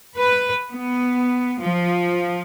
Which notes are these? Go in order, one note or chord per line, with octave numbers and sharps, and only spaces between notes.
B4
B3
F3